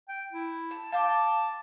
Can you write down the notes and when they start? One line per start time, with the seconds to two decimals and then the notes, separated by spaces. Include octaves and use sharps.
0.09 G5
0.32 E4
0.71 A5
0.92 F5 G5 A5 D6